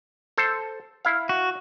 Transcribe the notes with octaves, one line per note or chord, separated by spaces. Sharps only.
A4 C5
E4 F5
F#4